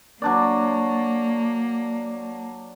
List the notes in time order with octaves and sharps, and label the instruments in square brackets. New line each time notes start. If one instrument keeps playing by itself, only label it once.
[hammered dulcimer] F#3 D4 D5 [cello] A#3